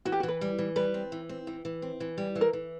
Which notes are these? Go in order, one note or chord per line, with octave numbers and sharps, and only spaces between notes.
E3 F#4
G4
F#4
E3
B4
G3
E3
G3 B4
C4
E3
C4
E3
E3
C4
E3
G3
E3
A#4
E3